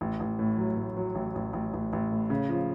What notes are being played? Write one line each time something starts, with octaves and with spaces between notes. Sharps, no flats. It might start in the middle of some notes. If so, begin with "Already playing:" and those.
A1
A1
A2
F#3
A2
F#3
A1
A1
A1
A1
A1
A2
C#3
F3